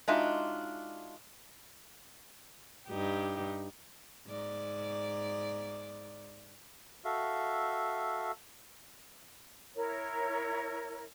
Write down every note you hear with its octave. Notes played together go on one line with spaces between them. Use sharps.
G#3 D4 D#4 F4 F#4 E5
G2 D#4 G4
G#2 D5
F#4 A4 E5 F5
E4 A#4 C#5